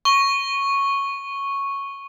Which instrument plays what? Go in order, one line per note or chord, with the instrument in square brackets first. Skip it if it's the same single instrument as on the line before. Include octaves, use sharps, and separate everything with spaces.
[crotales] C#6 G7